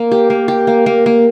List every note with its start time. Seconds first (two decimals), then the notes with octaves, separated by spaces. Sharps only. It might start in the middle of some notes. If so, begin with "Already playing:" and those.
Already playing: A#3
0.11 G4
0.30 A#3
0.48 G4
0.67 A#3
0.86 A#3
1.06 A#3